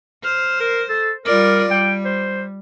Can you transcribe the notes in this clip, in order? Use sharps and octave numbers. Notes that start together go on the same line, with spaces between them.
C5 F6
A#4
A4
G3 F4 A#4 D5
G3 G5
C5